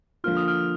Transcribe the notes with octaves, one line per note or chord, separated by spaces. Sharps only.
D3 F3 A#3 F4 F6
D#6
F6